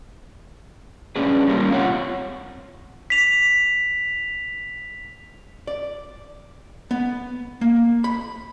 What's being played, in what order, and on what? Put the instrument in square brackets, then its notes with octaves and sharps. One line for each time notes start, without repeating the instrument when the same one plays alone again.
[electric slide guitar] C#4 D4 G#4 B4
G3 A#3 C#4 F4
C4 F4 C#5 E5 F#5
[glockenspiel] B6 F7
[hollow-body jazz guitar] D5
B3
A#3
B5